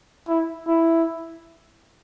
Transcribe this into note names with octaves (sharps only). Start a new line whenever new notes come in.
E4
E4